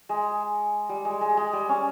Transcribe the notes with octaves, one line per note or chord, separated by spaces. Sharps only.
G#3
G3
G#3
G#3
G#3
G3
C#4